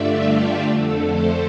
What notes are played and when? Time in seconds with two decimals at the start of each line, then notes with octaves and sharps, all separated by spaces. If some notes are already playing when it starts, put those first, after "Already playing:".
Already playing: G2 D3 A3 F4 D5 E5
0.21 G4
0.61 F2 D3 A3 A4
1.02 C5